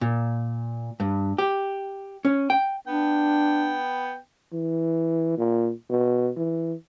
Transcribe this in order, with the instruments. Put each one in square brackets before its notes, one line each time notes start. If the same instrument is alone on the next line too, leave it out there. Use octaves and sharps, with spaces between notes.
[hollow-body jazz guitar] A#2
G2
G4
C#4
G5
[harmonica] B3 G5 [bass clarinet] D4
[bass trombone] E3
A#2
B2
E3